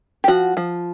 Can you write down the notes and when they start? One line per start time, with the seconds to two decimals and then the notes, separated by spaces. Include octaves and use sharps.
0.24 G4
0.28 F3 F#4
0.57 F3